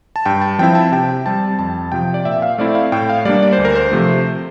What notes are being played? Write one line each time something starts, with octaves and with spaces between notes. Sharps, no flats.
A5
G2 G5
A5
F3 C4 E4 G5
A5
C3 G5
G3 C4 A5
F2 A5
C3 F3 G5
D5
A#2 E5
F5
A3 C4 E4 D5
F5
A2 G5
F5
G3 A#3 D4 D5
D5
C5
D2
A#4
C5
C3 F3 A3